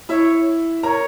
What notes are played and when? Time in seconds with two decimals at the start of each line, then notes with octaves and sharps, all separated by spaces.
0.09 E4 C#5 E5
0.83 A#4 C#5 A#5